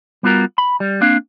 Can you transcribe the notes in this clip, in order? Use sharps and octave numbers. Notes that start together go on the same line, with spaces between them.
G3 B3 F4 F#4 A#4
B5
G3
A#3 C4 D4 F5